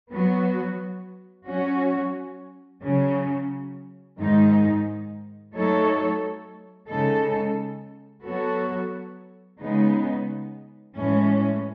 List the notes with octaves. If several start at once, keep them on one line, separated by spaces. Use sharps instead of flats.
F#3 B3 F#4
F#3 C#4 F#4 C#5
C#3 F#3 C#4
G#2 D#3 G#3 D#4
F#3 A3 D#4 A4 C#5
C#3 G#3 D#4 A4
F#3 B3 F#4 A4 C#5
C#3 G#3 B3 D#4
A2 E3 G#3 C#4